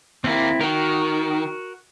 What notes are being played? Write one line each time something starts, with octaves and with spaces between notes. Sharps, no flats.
D#2 A#3 C4 E4
D#3 F#4 A#4